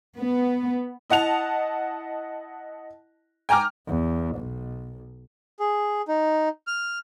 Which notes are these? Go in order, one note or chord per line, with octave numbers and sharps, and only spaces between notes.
B3
E4 D#5 F#5 A5 F7
G5 G#5 A#5 D6 F6
E2
B1
G#4
D#4
F6